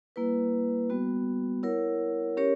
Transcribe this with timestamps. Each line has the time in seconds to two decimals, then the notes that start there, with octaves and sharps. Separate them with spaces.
0.16 G3 A#3 E4 B4
0.90 G3 B3 F#4
1.63 E4 A#4 C#5 F#5
2.37 C#4 G4 A#4 C#5